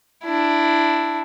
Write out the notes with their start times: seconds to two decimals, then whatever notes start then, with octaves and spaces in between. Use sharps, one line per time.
0.24 D4 E4